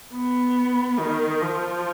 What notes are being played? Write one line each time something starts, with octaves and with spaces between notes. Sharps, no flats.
B3
D#3
F3